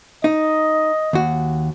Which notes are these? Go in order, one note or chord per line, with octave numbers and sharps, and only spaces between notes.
D#4 D#5
D#2 F#4